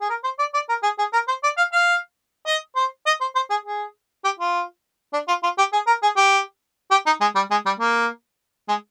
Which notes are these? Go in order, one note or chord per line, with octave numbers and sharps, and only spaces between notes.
G#4
A#4
C5
D5
D5
A#4
G#4
G#4
A#4
C5
D5
F5
F5
D#5
C5
D#5
C5
C5
G#4
G#4
G4
F4
D4
F4
F4
G4
G#4
A#4
G#4
G4
G4
D#4
G#3
G3
G#3
G3
A#3
G#3